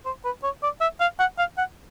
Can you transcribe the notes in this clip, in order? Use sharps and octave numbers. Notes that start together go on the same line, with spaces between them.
C5
B4
C#5
D5
E5
F5
F#5
F5
F#5